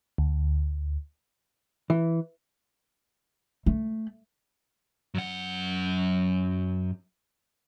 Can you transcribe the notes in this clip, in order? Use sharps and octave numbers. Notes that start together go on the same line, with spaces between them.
D2
E3
A3
F#2 F#5